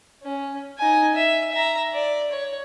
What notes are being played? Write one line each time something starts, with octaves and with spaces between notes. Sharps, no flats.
C#4
D#4 G#5
E5
E5 A#5
D5
C#5